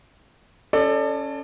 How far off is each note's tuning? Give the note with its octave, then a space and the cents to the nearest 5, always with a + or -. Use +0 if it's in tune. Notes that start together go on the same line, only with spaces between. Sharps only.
C#4 +0 A4 +5 D5 +30